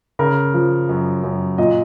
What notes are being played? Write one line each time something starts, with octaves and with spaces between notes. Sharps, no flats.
C#3 A#4
F3
F#2
F#2
A#2 D#5